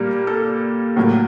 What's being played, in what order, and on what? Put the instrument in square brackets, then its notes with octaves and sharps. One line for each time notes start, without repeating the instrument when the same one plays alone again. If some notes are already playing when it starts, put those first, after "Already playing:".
Already playing: [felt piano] A#2 G3 A#3
A4
A2 F#3 A#3